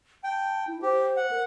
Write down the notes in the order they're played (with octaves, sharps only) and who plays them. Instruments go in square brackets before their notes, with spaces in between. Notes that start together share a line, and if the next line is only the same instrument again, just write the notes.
[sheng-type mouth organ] G5 [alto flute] A5
[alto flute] E4
[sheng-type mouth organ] G4 [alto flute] C5
[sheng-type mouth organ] F#5
[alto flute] A#4